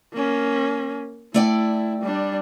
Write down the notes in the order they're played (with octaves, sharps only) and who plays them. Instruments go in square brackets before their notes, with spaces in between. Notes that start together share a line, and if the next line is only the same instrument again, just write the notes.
[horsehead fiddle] A#3 C#4
[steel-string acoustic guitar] A3 D5 G5 [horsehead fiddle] E4
[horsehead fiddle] G3 D4